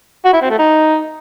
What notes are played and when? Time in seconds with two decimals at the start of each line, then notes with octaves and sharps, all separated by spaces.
0.25 F#4
0.33 E4
0.42 C4
0.50 A3
0.59 D#4